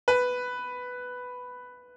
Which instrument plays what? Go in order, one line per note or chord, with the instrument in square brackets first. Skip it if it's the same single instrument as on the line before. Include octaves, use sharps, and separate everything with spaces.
[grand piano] B4